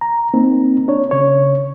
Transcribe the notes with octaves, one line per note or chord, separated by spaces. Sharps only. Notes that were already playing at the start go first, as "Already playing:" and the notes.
A#5
A#3 C4 D#4
D4 C#5
C#3 C#5